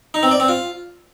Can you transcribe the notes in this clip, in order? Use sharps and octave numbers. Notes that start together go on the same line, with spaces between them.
D#4
C4
D5
C4
F4